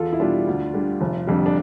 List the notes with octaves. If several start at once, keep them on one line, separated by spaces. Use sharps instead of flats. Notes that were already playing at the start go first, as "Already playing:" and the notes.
Already playing: E2 F4 A4
E4
B2 G3 D4 F4
D2
D3 G3
F1
F2 D3 G3
D4